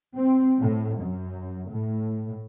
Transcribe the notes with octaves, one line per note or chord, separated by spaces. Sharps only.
C4
A2
F#2
A2